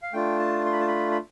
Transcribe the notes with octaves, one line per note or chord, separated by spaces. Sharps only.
F5
A3 D4 F4 G5
A5
C6
B5
A5
B5
B5